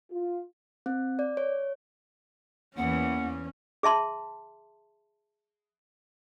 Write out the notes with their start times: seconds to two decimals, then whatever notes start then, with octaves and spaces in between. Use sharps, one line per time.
0.12 F4
0.86 C4
1.19 D5
1.37 C#5
2.77 E2 E3 A#3 C#4 F#5
3.83 G#4 E5 A5 C6